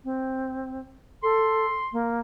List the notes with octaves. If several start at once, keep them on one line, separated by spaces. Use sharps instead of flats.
C4
A4 C6
A#3